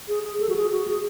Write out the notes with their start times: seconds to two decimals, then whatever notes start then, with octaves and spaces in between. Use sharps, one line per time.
0.08 G#4
0.24 G#4
0.40 A4
0.49 F#4
0.56 G#4
0.72 F#4
0.87 G#4